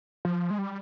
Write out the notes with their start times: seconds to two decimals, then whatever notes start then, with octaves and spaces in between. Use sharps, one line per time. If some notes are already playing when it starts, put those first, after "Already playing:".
0.25 F3
0.50 G#3
0.58 G3